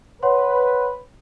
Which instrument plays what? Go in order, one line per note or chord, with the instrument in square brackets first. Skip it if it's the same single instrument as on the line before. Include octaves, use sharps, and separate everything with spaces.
[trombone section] B4 [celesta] C#5 F#5 C6